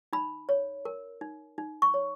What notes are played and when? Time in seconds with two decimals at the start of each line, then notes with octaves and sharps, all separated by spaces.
0.13 D#4 B5
0.49 C#5
0.85 A#4
1.21 D#4
1.58 D#4
1.82 C#6
1.94 C#5